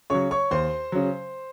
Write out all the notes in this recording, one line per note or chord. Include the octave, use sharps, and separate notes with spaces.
C#3 F#3 C#5 C#6
C#5 C#6
D#2 C5 C6
C#3 F#3